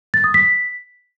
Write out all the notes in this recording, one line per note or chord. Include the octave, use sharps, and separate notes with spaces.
A6
D#6
B6